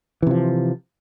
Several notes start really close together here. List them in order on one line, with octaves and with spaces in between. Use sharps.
E3 C3 F3